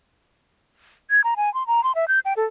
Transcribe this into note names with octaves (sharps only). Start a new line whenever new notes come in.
G#6
A#5
G#5
C6
A#5
C6
E5
G6
G5
A4